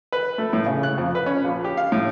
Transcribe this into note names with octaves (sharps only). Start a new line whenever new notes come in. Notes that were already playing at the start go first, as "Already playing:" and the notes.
B4
A3
A2
C#3
F#6
F2
B4
C#4
A#1
G4
F5
A2